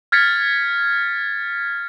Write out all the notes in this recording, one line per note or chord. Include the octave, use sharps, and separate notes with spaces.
F6 G#6 A6 B6 C#7